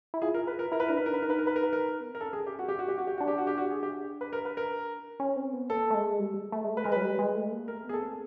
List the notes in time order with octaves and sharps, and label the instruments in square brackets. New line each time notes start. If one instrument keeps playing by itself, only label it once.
[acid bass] E4
[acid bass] F4 [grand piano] G#4
[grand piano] A#4
B4
A#4
[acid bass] E4 [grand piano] A#4
[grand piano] B4
[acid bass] D4 [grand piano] A#4
[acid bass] D#4 [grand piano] B4
[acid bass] D4 [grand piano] A#4
[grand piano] B4
[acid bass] D#4 [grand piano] A#4
[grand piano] B4
A#4
B4
A#4
B4
A#4
[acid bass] B3
[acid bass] C4 [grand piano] A#4
[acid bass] C#4 [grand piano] A4
[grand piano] G#4
G4
F#4
G4
F#4
G4
F#4
G4
[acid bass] D4 [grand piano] F#4
[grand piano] G4
F#4
G4
F#4
G#4
G4
B4
A#4
B4
A#4
[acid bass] C#4
C4
B3
[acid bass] A#3 [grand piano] A4
[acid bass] A3
G#3
G3
A3
G#3
A3
[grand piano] B4
[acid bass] G#3 [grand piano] A#4
[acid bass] F#3 [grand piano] B4
[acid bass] G3
G#3
A3
A#3
[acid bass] A3 [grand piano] A#4
[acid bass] B3 [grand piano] G#4
[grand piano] A4
[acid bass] C4